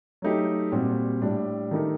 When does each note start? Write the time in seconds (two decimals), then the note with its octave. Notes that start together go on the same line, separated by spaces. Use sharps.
0.22 F#3 A3 D#4 G4
0.72 A#2 G3 C4 F#4
1.22 A2 G3 D4
1.71 D#3 A3 D#4 G4 A#4